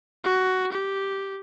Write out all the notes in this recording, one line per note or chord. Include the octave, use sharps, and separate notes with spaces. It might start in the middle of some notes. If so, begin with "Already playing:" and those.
F#4
G4